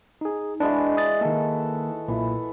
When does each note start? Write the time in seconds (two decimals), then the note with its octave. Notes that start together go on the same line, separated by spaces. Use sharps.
0.21 D#4 G#4
0.60 E3 G#3 D4 F#4
0.96 D5 D#6 A6
1.21 D#3 A#3 A4
2.08 B1 A#2 E3